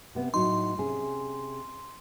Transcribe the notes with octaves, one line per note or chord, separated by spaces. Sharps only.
C3 B3
A2 F#3 D#4 C6
C3 C#4 G#4